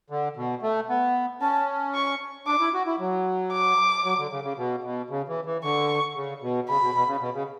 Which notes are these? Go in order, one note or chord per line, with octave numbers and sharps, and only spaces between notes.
D3
B2
A3
B3
C#4 A5
C#6
D4 D6
E4
F#4
E4
F#3
D6
F#3
D3
C#3
C#3
B2
B2
C#3
E3
E3
D3 C#6
C#3
B2
C#3 B5
B2
B2
C#3
B2
C#3